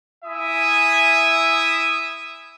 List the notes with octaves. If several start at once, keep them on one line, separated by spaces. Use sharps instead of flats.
E4 E5 G#5 D#6